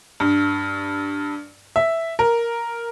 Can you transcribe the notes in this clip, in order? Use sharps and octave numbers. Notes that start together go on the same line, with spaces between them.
G2
E5
A#4